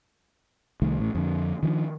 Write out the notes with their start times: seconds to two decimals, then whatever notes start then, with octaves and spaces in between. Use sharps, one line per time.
0.82 C2 D#3 A3
0.98 A1 A2
1.15 F2 D3
1.63 D#3 F3 C#4 D4